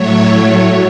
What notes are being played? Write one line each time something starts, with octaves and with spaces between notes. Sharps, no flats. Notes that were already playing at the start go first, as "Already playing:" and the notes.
Already playing: A2 F#3 A3 C#5